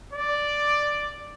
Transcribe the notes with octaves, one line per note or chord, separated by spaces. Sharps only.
D5